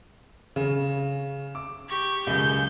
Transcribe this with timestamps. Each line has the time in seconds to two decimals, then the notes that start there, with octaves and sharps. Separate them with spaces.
0.56 C#3
1.55 D6
1.89 G4 C#6
2.27 C#2 F#2 C#3 G6